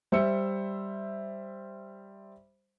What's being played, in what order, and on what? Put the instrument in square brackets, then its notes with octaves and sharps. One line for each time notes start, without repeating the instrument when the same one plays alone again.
[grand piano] G3 C5 E5 E6 C#7